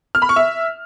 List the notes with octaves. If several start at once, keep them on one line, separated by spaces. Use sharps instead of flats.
F6
B5
C#6
E5